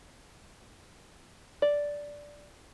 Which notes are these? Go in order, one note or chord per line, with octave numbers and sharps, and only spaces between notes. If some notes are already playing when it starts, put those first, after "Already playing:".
D5